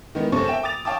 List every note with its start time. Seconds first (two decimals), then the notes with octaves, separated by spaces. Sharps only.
0.15 D#3 E3 G#3 B3
0.32 F#1 C3 A4 C5 C#5 C#6
0.48 E5 G5 E7
0.63 D6 D#6 A6 F7
0.85 C#5 F5 G5 A5 D6 D#6